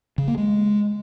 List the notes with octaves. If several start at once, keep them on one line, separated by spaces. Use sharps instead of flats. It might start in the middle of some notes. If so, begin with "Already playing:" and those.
C#3
A#3
G#3